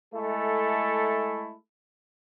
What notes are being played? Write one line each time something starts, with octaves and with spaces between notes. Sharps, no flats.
G#3 A3 E4 A4